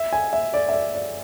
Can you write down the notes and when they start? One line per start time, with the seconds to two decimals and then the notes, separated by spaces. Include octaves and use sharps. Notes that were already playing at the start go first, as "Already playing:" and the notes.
Already playing: E5
0.13 G#5
0.33 E5
0.54 D5
0.69 E5
0.73 D5
0.95 D5